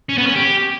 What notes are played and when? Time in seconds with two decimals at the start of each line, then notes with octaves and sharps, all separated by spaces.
0.09 C#4
0.18 B3
0.27 C#4
0.36 G4